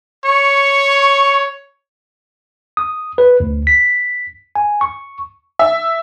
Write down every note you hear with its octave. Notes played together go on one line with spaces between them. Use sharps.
C#5 C#6
D#6
B4
D2
B6
G#5
C#6
E5